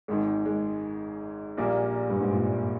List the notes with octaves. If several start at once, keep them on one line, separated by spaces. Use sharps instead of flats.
G#1 G#2 D#3 G#3
G#3
A#1 A#2 G3 A#3
G2
G#2
A#2